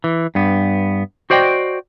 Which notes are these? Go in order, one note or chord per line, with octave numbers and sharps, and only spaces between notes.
E3
G2 B3
F#4 C5 D5 D#5 G5